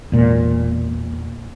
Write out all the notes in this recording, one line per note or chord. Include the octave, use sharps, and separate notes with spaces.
E1 A#2